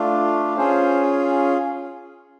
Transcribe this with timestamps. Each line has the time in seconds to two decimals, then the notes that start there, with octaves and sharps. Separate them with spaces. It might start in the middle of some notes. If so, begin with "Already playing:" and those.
Already playing: A3 D4 F4
0.57 C#4 F4 G#4 C5